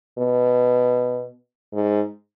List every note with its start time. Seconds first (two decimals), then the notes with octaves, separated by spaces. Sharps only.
0.18 B2
1.73 G#2